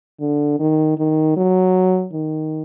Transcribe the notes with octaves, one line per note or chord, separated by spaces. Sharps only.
D3
D#3
D#3
F#3
D#3